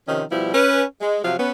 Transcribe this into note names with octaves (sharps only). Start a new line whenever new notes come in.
C3 D#3 F3 C#4
B2 F3 G3 E4
C#4 B4
G#3
C3 F3 F#3 F5
B3 C#4